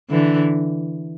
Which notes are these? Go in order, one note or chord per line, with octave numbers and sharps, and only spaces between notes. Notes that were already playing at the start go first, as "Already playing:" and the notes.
D3 E3